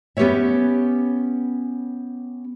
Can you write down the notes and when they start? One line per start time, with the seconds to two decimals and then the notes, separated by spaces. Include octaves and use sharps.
0.17 B3 C#4 G4 B4 C#5 E5